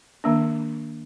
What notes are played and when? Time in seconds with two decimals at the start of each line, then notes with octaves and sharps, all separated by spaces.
0.24 D#3 A#3 D4